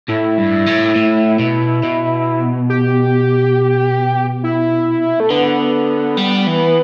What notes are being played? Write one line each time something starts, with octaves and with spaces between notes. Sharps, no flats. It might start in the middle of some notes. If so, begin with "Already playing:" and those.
A2 E4
G2
A2
A2
B2
B2
G4
E4
A3
D3 B3
G3
E3